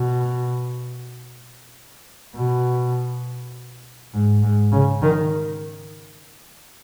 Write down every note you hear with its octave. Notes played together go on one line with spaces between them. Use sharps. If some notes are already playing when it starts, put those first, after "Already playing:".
Already playing: B2
B2
G#2
G#2
C#3
D#3